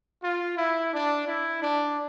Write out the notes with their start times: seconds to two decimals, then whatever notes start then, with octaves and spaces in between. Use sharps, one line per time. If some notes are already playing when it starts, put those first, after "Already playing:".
0.22 F4
0.57 E4
0.92 D4
1.26 E4
1.61 D4